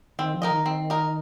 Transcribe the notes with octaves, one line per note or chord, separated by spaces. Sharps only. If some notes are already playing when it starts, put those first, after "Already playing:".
D#3 C4
F3
D#4 A#4 D#5
D#3
C4
D#4 A#4 D#5